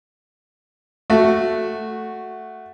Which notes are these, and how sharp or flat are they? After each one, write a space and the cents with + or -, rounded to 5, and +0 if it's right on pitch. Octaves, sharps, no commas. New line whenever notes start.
A3 +0 F#4 +0